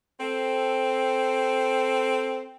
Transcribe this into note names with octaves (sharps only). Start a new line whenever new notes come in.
C4 A4